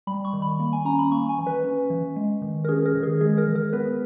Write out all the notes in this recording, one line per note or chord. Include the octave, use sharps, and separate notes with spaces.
G3 B5
C#6
D#3
B5
A#3
G#5
C#4 A#5
B5
A#3 C#6
G#5
E3
B4
C#4
E3
G#3
D#3
A#4
C#4 G#4
A#4
D#3
G#4
G#3 G#4
A#4
E3
A#4
B3 B4